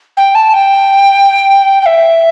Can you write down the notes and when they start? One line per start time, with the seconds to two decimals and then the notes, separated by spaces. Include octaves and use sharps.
0.17 G5
0.35 A5
0.53 G5
1.81 G5
1.86 E5